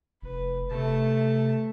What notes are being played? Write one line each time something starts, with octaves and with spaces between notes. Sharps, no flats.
F1 B4
C3 A3 A5